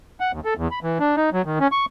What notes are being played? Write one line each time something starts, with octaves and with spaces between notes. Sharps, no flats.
F#5
D#2
A4
E2
B5
E3
D4
D#4
F#3
D#3
C#4
C#6